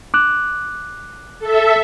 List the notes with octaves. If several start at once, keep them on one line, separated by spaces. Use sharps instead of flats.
D6 F#6
A4 E5